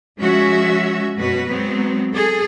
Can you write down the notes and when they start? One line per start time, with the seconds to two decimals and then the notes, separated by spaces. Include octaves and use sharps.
0.19 F3 G#3 C#4 F#4 E5
1.18 F#2 B2 F#4 B4
1.48 F#3 G#3 B3 C4
2.13 G#4 A4